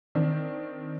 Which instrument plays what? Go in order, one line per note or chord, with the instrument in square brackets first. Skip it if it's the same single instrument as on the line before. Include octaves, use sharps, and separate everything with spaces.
[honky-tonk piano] D#3 C4 D4